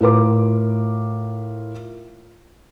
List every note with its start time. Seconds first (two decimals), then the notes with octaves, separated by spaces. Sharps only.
0.01 A2 F4 A#4 D6